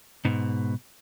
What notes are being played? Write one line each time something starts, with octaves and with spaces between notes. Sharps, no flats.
G#2 B2